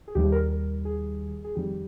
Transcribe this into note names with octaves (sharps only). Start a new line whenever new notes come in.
G#4
D#2 D#3 G3 G4
A#4
A#4
G#4
G#4
F2 D#3 G3 G4